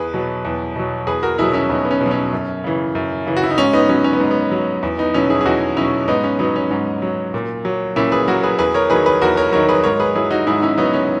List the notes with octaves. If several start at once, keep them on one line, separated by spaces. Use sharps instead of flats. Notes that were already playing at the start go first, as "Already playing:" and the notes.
Already playing: E2 G#4 B4
B2 F#3
E2
B2 F#3
E2 G#4 B4
F#4 A#4
B2 F#3 E4 G#4
C#4 E4
E2 B3 D#4
B3
C#4
B2
F#3
C#4
F#2
C#3 E3
F#2
C#3 E3
F#4
E4
D#4
G#2 C#4
B3 D#4
F#3 C#4
C#4
B3
G#2
B3
F#3
E2
B3 D#4
B2 F#3 C#4 E4
E4 G#4
G#4
E2 D#4 F#4
B2 F#3 C#4 E4
G#2 B3 D#4
C#4
F#3 B3 D#4
C#4
G#2 C#4
F#3
A#2
F#3
A#2 C#4 E4
G#4 B4
F#3 F#4 A#4
G#4 B4
E2 G#4 B4
A#4 C#5
D#3 F#3 G#4 B4
G#4 B4
E2 F#4 A#4
A#4 C#5
D#3 F#3 A#4 C#5
G#4 B4
G#2 A#4 C#5
G#4 B4
F#3 E4 G#4
D#4 F#4
G#2 E4 G#4
C#4 E4
F#3 B3 D#4
C#4